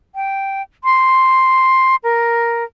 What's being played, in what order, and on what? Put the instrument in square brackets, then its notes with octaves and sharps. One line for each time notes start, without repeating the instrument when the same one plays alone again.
[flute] G5
C6
A#4